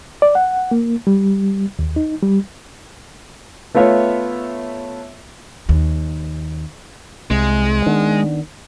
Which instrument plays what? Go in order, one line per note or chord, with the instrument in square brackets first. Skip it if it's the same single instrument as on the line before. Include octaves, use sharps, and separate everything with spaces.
[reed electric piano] D5
F#5
A#3
G3
D#2
D#4
G3
[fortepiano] A3 B3 F4 C#5 E5
[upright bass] D#2
[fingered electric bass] C2 [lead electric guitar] G#3
[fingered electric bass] D#3 B3 D4